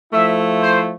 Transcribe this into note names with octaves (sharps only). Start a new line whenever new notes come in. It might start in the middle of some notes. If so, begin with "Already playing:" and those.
F3 A3 E4 E5
C5